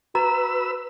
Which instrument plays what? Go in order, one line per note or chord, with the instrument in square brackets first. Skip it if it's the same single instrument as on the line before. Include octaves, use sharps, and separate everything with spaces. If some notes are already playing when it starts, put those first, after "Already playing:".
[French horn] F#4 [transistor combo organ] B4 E6 [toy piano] A#5